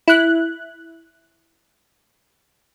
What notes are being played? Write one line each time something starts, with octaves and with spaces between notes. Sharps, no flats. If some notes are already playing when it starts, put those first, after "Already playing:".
E4 F#6